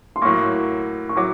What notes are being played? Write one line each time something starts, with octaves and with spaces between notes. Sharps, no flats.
C6
A2 F#3 A#3 C#6
C#6
A2 F#3 D6